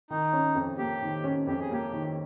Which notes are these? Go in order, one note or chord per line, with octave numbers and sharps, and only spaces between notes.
D#3 D#4
C#4
F2
A#3 G4
D#3
C#4
F2 G4
G#4
A#3 G4
D#3